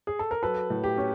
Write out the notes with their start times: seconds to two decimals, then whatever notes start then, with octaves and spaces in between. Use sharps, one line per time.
0.07 G#4
0.19 A4
0.31 A#4
0.43 F#3 A4 B4
0.70 A2
0.84 G4
0.98 C#4